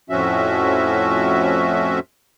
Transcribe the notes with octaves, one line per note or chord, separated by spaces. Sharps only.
F2 A2 F3 C#4 F#4 E5